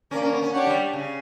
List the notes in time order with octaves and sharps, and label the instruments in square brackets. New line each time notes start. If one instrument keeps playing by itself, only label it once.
[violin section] A#3 D4 A#4 [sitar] C#4
[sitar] C#4
B3
C#4
[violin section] D4 G4 C#5 F#5
[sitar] G3
C#3